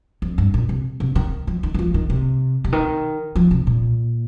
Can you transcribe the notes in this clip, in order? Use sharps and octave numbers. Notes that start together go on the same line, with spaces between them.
F2
G2
A#2
C3
C3
D#3
F3
D#3
D#3
F3
D#3
C3
C3
D#3
F3
C3
A#2